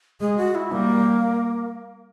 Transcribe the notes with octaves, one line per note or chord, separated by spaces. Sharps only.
G#3 G#4
F#4
E4
G3 A#3